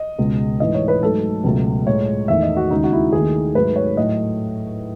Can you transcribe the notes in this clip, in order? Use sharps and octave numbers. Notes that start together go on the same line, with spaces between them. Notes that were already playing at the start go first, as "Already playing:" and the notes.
Already playing: D#5
C#2 B2 G#3
G#2 E3 A3 D#5
C#5
B4
G#2 F#3 A3 A4
C#2 B2 F#3 A3
A2 G#3 C#5
E2 D#3 A3 E5
D#5
F#4
D#2 C#3 G#3 D#4
F#4
E4
D#2 D#3 A3 G#4
G#2 F#3 A3 B4
C#5
A2 F#3 A3 D#5